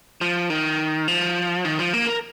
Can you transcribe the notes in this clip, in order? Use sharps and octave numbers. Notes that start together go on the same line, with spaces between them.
F3
D#3
F3
D#3
F3
A#3
A#4